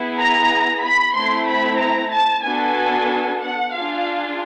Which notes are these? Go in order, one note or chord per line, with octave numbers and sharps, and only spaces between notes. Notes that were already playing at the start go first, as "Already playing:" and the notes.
Already playing: B3 E4 G#4
A#5
B5
A3 C4 E4 C6
B5
A#5
A5
B3 D4 F#4 A4 G#5
F#5
D4 F4 G#4 F5